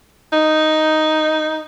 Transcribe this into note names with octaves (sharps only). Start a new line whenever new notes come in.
D#4